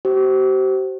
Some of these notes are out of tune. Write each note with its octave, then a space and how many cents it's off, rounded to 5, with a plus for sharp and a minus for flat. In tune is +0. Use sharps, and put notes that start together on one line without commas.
G4 -45 C5 +0